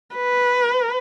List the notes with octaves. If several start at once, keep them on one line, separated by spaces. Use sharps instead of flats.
B4